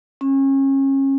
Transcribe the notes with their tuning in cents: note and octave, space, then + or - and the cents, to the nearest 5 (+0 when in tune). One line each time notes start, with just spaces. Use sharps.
C#4 -30